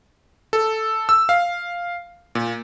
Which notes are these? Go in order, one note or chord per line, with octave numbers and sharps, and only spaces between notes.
A4
E6
F5
A#2